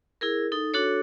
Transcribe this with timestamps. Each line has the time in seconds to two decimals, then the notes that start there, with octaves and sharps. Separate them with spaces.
0.21 E4 G#4 A#4
0.52 D#4 A4
0.74 D4 F#4 A4 C#5